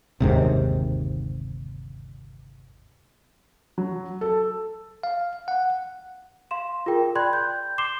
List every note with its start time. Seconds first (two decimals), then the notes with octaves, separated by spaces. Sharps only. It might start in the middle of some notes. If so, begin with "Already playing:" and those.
0.20 G1 D#2 G#2 C3
3.78 F#3
4.21 A4
5.03 F5
5.48 F#5
6.51 F5 C6 E7
6.86 F4 G#4 A#4 G5
7.15 D5 G5 B5 C6 F#6 G#6
7.33 G6
7.78 C6 D6 C7 E7 G7